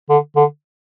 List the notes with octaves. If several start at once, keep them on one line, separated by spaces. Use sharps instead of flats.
D3
D3